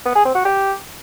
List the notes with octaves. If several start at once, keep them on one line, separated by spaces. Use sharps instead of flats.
B3
G#4
C4
F#4
G4